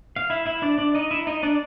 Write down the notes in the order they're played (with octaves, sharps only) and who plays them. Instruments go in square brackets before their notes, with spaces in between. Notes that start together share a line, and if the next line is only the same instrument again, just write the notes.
[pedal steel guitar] F5
E4 E5
E4 E5
D4 D5
D4 D5
D#4 D#5
E4 E5
D#4 D#5
D4 D5